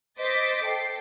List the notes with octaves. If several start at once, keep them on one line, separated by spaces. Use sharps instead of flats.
C5 D#5 D6 A6 B6
A4 G5 C7